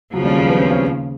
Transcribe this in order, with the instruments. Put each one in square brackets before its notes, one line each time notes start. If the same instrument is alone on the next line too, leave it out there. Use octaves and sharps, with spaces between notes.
[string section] D#2 C#3 F3 [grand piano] F#3
[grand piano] G3
G3
B3
C4
C#4